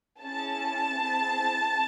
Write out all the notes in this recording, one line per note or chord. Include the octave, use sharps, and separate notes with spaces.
C#4 E4 G#4 A5
C4 E4 G#4